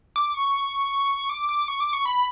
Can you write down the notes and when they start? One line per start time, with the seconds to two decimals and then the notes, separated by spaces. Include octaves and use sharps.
0.16 D6
0.34 C#6
1.29 D6
1.49 D6
1.68 C#6
1.80 D6
1.93 C#6
2.06 B5